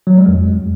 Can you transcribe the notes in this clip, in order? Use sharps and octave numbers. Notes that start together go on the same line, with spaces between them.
F#3
G#3
F2